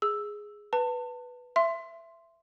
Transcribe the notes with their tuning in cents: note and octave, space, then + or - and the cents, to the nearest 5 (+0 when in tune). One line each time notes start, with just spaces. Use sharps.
G#4 +0 E6 +0
B4 +0 A5 +30
E5 +20 C6 +0